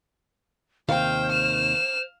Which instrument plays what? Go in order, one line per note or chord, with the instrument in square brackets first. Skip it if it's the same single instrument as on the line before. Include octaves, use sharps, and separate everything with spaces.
[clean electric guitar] D#2 C3 D#3 [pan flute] C5 [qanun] F5 [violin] G5
[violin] F6 E7